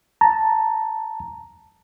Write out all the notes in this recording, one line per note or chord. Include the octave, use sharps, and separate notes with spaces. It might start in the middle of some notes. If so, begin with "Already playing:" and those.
A5 A#5